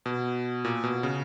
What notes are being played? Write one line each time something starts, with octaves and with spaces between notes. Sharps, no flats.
B2
A#2
B2
C#3